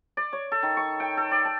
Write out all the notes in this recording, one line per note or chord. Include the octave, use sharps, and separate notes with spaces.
D5
C#5
A4
D#3
C#6
G5
A4
D5
A5